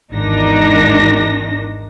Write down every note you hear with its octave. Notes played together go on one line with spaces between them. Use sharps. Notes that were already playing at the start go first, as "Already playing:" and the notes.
G#1 E2 D#3 D4 D#4 A#6